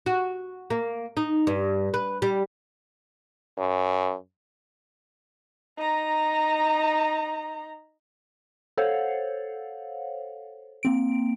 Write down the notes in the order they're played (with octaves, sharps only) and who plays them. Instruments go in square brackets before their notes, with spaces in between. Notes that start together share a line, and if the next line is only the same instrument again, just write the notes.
[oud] F#4
A#3
D#4
G2
B4
G3
[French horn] F#2
[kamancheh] D#4 A#5
[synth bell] A4 C5 C#5 F5 F#5
A#3 C4 D7